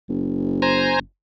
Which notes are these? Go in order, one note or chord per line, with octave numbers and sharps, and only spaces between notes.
F#1
C5 G#5 A#5